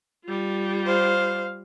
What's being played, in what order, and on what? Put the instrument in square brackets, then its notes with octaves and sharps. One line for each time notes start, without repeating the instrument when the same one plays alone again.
[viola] G3 F4
[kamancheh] C5 F5